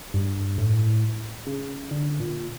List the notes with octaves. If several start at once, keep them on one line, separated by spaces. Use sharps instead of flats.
G2
A2
C#3
D3
A#2